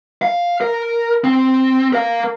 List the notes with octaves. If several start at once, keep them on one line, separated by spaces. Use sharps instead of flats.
F5
A#4
C4
A#4 F5